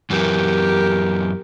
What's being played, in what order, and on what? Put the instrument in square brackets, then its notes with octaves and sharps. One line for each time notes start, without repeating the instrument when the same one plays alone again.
[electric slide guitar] F#2 E3 [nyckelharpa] G4 A#4